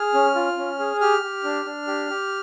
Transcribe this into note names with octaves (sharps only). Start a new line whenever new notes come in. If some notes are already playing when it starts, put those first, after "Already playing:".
Already playing: G#4 F6
C#4
F4
C#4
G#4
G4 F6
G4
D4
D4
G4
G4